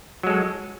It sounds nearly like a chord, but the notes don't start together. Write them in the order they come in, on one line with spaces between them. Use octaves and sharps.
F#3 G#3 A4